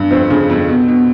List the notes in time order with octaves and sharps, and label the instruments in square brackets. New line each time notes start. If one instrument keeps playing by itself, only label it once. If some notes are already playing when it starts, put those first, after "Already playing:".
Already playing: [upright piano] G2
F2 C4
C#3
F2
B2
B2